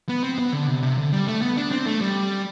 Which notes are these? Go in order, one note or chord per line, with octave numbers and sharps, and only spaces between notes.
B3
C4
B3
D3
C3
C3
D3
G3
A3
B3
D4
C4
A3
G3